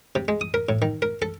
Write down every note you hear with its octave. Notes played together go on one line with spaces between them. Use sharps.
C3
G#3
D#6
A#4
A2
D#3
A#4
A4